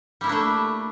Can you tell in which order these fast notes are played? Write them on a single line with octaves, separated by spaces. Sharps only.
G3 E4 A#3 D4 A3